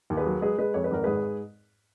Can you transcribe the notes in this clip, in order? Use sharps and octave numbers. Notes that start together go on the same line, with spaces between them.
D#2
G#4 B4
F#3
G#3 G#4 B4
G#3 G#4 B4
F2 C#5
B4
G#1 A#4
G#2 G#4 B4